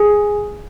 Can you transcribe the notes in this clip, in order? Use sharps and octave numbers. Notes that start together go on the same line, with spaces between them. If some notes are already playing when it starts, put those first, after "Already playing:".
Already playing: G#4